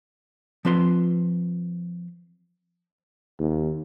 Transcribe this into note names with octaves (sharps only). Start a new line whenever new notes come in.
F3 C4 B4 C6
D#2